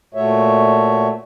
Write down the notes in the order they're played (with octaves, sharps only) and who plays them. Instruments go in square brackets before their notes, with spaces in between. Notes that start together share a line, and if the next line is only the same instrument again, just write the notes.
[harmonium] A#2 A3 F#4 C#5 E5